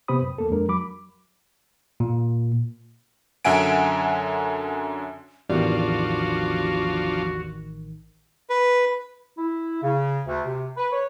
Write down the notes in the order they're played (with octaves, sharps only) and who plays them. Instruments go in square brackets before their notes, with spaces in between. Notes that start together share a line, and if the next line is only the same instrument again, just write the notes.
[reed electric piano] C3 B3 G4 C5 B5 D#6
F#2
D#2 A#3 A4
F2 G#3 D4 A#4
F#3 B5 D6
[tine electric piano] A#2
[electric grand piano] F#2 D3 E5 F#5 G#5 D7
[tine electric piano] A1 D#3 [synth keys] E2 G3 [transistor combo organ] F3 D4 F4 [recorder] F#4
[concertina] B4
[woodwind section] E4
C#3
D2
C3
B4
C#5